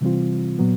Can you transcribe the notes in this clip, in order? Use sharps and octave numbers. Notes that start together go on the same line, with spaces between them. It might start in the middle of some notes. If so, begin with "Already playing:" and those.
C3 E3 G3 C4 F4
A#2 F#3 B3